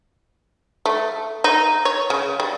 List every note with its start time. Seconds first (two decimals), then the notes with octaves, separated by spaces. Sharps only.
0.86 A3
1.44 D#4
1.85 C#5
2.10 C#3
2.40 G3